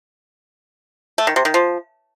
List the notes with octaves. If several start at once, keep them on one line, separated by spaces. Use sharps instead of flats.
A3
D#3
C3
D#3
F3